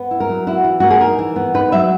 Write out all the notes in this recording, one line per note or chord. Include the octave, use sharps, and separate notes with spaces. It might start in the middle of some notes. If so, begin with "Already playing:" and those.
Already playing: B3
E4
A#4
F#3
E4 F#4
E3
A#3 F#4
G#4
D#4 A#4
E3
B3
D#4 B4
F#3 E5